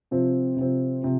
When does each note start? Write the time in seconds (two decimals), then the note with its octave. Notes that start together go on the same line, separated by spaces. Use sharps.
0.11 C3 F3 C4
0.57 C3 F3 C4
1.03 C3 F3